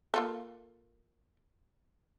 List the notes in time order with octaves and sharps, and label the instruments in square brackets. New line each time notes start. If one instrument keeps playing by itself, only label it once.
[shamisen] A#3 F4 A4